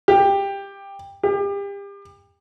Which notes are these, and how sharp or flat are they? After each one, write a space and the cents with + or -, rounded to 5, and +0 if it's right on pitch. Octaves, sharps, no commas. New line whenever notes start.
G4 +15
G4 +35